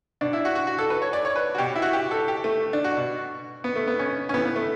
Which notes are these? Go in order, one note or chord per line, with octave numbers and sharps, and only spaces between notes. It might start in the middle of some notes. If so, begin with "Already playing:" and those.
B2 D4
E4
F#4
F#4
F#4
A4
B4
C#5
D5
C#5
B4
F#4
B2 G4
E4
F#4
G4
A4
G4
A3
D4
F#4
B2
B3
A3
B3
C#4
C#4
A2 E3 B3
B3
A3